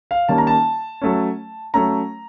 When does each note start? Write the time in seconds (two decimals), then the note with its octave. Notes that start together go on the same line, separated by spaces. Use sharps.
0.11 F5
0.29 D#3 G3 A#3 C#4 A5
0.38 A#5
0.47 A5
1.01 F#3 A3 C#4
1.74 F#3 A3 C#4 A#5